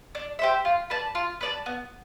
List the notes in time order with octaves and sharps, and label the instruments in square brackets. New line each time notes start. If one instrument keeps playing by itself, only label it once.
[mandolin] D4
G4 C5 E5
F4
B4 D5 A5
F4
B4 D5 A5
B3